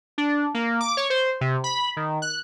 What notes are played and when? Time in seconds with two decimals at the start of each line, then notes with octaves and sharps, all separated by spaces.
0.18 D4
0.54 A#3
0.81 D6
0.97 C#5
1.10 C5
1.41 C3
1.64 B5
1.97 D#3
2.22 F#6